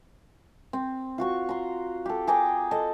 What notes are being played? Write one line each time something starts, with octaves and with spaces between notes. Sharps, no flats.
C4
F4 F#4 C#6
A#5 C6
G4 A4
G#4 G5 A#5 D6
A4 D#5